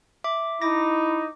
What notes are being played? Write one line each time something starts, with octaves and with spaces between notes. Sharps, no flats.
E5 D6
D#4 E4 D6 A#6